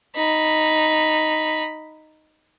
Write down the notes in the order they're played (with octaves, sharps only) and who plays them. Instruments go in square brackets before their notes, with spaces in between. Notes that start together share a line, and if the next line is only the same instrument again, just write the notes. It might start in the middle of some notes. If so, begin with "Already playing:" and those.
[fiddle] D#4 B5